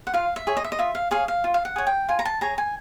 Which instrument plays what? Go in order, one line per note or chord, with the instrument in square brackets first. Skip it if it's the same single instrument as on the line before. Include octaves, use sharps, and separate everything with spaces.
[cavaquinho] F#5
F4 F5
E5
G#4 C#5
D#5
E5
D#5
F4 E5
F5
G#4 C#5 F5
F5
F4
F5
F#5
G#4 C#5
G5
F4 G#5
A#5
A5
G#4 C#5 A#5
G#5